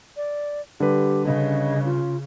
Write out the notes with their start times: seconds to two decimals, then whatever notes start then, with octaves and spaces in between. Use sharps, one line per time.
0.17 D5
0.80 D3 G3 G4 B4
1.26 C#3 D#5
1.85 F4